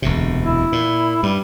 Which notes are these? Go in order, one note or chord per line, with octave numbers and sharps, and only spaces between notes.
E1 D2 C3
E4
A#2
G2 G3